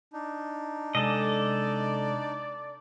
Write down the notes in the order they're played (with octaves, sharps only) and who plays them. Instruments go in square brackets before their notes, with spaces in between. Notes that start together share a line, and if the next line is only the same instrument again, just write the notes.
[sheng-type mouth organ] D4 D#4
[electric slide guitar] C3 G#3 G#5 [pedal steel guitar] A4 D#5 [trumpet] D5